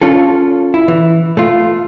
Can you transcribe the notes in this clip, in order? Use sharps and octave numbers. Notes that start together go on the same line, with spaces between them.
C#4 F4 A4
E4
E3
A3 F4